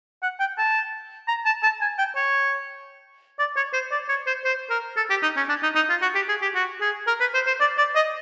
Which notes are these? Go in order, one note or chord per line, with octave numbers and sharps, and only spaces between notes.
F#5
G5
A5
A#5
A5
A5
G#5
G5
C#5
D5
C#5
C5
D5
C#5
C5
C5
A#4
A4
G4
D#4
C#4
D4
D#4
D#4
F4
F#4
G4
G#4
G4
F#4
G#4
A#4
B4
C5
C5
D5
D5
D#5